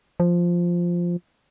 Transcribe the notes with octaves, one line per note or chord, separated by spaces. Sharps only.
F3